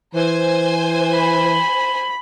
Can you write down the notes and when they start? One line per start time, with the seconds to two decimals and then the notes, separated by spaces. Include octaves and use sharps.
0.15 E3 C5 G#5
1.15 B5